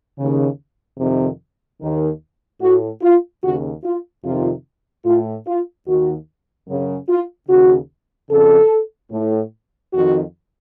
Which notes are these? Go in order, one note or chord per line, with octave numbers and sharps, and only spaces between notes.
D#2 C#3
F2 C3 D#3
D#2 D#3
A2 F#4
F4
D#2 C#3 F#4
F4
F2 C3 D#3 F4
A2 F4
F4
D#2 D#3 F#4
F#2 C#3
F4
D#2 C#3 F#4
F2 C#3 A4
A2
F2 D#3 F#4